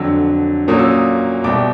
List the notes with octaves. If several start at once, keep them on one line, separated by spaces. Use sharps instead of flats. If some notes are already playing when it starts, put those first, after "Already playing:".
Already playing: F2 D3 F#3 E6
A#2 F#3 A#3 C#4 D#6
E6
D#6
C2 B2 G3 D6